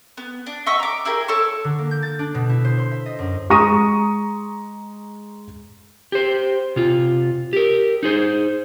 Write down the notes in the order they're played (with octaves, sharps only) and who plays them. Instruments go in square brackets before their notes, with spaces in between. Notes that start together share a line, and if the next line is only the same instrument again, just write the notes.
[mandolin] B3
D4
D#5 E5 F#5 C#6
A#5 D6
E4 G4 G#4 A#4
A4 C#5 A5 C#6
[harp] D3
A#3
G6
A6
D4
B2
E4
C5
C6
E5
D#5
F#2
[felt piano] G#3 A#5 C#6 D#6 A#6 D#7
[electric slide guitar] G4 C5
C3 F4
G4 A#4
D#4 G#4 C5